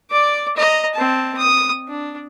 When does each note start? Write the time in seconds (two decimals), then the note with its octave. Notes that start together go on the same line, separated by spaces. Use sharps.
0.10 D5 D6
0.56 D#5 A#5
0.94 C4 A5
1.37 D#6
1.88 D4